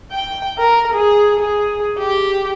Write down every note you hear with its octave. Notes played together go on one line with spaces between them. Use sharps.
G5
A#4
G#4
G#4
G4